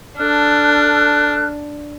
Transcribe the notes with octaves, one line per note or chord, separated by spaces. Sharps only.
D4 A4 F6 F#6